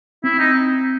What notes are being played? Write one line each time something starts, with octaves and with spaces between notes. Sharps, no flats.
C4 E4
D#4